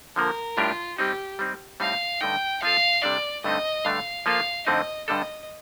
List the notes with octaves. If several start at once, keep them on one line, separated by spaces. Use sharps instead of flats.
D3 F3 A#3 A#4
A2 G3 D4 F4 G4 A#4
G3 C4 D#4 G4
G3 C4 D#4
A2 G3 C4 D#4 F5
G2 D3 A3 D#4 G5
F3 C4 F4 A4 F5
C3 G3 D4 A4 D5
G2 D3 A3 C4 D#4 D#5
G2 D3 A3 D4 F5
F3 A#3 F4 A4 F5
F2 D3 A3 C4 D#4 D#5
G2 D3 G3 D4 A4 D#5